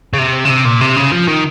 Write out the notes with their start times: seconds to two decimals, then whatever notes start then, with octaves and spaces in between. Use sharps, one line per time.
0.14 C#3
0.18 C3
0.45 C#3
0.50 C3
0.65 A#2
0.81 C3
0.96 C#3
1.12 F3
1.28 D#3